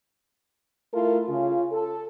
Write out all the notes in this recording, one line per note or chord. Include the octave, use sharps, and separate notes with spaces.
A3 E4 F4 A4 A#4
C#3 F4
A4